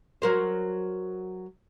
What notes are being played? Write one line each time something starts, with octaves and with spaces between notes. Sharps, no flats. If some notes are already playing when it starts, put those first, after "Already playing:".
F#3 A#4 C5